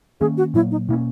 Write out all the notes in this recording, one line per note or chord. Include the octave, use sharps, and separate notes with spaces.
D#3 A#3 C#4 G#4
F#4
A#2 F#3 A#3 E4
D#4
B2 A#3 C#4 E4